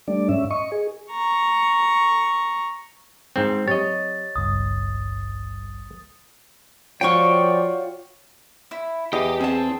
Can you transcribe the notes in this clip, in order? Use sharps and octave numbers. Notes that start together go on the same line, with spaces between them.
G3 A3 D4 D5
G#2 C#4 E5
D#5 C#6
G#4
A#5 C#6
G#2 C4
F#3 C4 G4 C#5 D#5 A6
G#1 C#2 G2 D#6
F3 F4 F#4 C#5 D5 G5 C#6
E4
E2 G4 D#5 G5
C4 G#4 A5